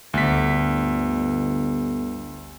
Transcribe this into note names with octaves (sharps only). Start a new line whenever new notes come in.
G1 D2 B6